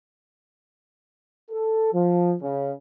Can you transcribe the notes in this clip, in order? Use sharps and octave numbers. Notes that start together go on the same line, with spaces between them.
A4
F3
C#3